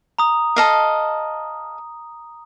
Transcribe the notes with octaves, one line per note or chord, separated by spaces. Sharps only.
A#5 D#6
A4 D#5 F5